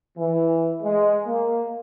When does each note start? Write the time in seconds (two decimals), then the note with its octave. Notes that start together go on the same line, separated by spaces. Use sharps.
0.18 E3
0.83 G#3
1.27 A#3